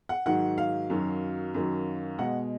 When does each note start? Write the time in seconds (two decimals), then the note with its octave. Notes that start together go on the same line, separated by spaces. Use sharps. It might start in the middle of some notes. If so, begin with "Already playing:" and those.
0.09 F#5
0.26 G#2 D#3 F#3 F#5
0.58 F5
0.90 F#2 D#3 F#3
1.55 F#2 D#3 F#3
2.19 B2 G#3 F#5